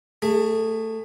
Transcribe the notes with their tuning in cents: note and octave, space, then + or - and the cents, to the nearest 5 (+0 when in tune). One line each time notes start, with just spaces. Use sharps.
A3 +15 G#4 -15